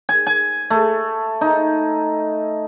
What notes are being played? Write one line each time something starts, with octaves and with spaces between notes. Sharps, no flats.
G#5
G#5
A3
D#4